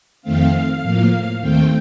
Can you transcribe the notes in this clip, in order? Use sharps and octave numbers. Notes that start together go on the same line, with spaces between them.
F2 D#3 A3 C4 F5
A2 F3 A#3
D#2 D#3 A3 C4 G5